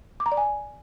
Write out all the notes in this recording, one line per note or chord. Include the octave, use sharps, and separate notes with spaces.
D6
A#5
D5
G#5